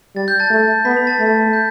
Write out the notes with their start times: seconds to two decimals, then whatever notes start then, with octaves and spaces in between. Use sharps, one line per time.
0.16 G3 A6
0.28 G6
0.40 A5 A6
0.50 A3
0.85 B3 B5 B6
0.96 B5 B6
1.07 A5 A6
1.19 A3
1.53 G6